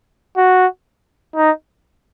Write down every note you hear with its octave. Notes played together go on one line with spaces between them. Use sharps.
F#4
D#4